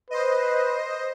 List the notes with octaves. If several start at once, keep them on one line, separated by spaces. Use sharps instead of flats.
B4 C5 D#5